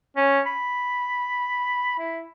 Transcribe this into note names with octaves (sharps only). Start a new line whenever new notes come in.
C#4
B5
E4